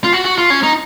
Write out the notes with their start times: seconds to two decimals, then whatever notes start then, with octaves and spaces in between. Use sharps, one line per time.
0.04 F4
0.13 F#4
0.25 F#4
0.38 F4
0.50 C#4
0.63 D#4